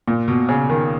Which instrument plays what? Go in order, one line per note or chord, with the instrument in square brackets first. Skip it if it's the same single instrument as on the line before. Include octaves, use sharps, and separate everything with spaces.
[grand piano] A#2
B2
C#3
D#3